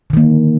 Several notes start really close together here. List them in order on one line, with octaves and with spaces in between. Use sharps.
D3 D#3 A#3